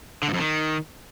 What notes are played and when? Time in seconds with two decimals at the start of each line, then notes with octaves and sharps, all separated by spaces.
0.23 D3
0.28 G2
0.34 F2
0.39 D#3